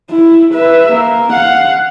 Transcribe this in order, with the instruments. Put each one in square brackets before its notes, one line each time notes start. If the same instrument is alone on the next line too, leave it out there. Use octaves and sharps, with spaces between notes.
[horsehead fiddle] E4
B4 E5
A#3
F5 F#5